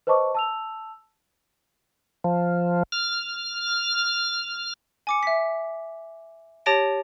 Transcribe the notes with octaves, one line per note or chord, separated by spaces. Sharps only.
B4 C5 D#5 A5 C#6 D6
A5 E6 F7
F3
F6
G#5 D6 C#7
E5 B6
G4 C#5 A5 A6 A#6 D7